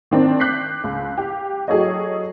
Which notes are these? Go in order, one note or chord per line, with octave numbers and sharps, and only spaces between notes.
D#3 C4 D4
D6 F#6 G6 B6 C7
C#2
G4
F#3 G#4 A4 C#5 D#5